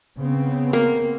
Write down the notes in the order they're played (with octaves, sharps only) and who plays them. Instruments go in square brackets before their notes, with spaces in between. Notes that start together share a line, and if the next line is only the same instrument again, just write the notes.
[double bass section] C#3 B3 C4
[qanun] A#3